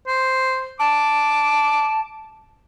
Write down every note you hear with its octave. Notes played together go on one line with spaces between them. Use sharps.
C5
A5 D6